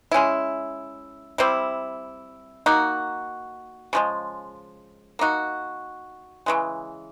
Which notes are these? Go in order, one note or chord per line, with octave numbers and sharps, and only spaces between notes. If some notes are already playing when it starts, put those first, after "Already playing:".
G#3 C#4 E4
G3 C4 E4
A#3 D#4 F#4
C#3 F3 G#3
A#3 D#4 F#4
C#3 E3 G#3